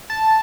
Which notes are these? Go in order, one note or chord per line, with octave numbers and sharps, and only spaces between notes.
A5